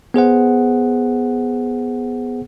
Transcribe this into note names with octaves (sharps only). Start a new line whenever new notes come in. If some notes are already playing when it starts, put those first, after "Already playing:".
B3 G#4 C5 F#5